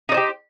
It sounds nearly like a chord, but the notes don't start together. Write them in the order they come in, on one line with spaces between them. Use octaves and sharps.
D#4 D5 C5 G4